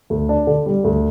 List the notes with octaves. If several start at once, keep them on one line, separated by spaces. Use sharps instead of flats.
D2
D4
D3
G3
D2